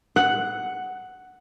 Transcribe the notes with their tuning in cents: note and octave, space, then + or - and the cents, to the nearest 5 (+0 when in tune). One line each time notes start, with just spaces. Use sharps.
F#5 +5